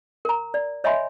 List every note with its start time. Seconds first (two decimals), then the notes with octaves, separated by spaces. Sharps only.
0.25 A#4 A#5
0.54 D5
0.84 C#5 D#5 E5 G#5 B5 C6